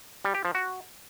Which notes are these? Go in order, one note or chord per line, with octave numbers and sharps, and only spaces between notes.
G3
G4
F3
F#4